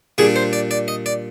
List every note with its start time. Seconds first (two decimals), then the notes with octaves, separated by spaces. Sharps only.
0.18 A#2 G3 D4 G#4
0.36 C5
0.53 D5
0.71 D5
0.88 D#5
1.06 D5